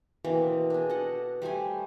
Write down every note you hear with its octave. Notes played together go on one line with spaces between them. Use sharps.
B2 E3 A#3 C4
D4 G#4
A4 D#5 F#5
G3 A3 C5 G#5